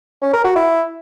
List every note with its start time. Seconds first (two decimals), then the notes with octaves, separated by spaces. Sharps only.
0.22 C#4
0.33 A#4
0.44 F#4
0.56 E4